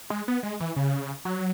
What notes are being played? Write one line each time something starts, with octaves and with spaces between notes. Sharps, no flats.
G#3
B3
G#3
E3
C#3
F#3